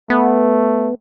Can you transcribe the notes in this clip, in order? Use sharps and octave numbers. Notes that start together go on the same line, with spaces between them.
A3 B3